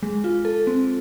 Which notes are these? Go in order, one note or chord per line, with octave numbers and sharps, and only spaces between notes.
G#3
F4
A4
C4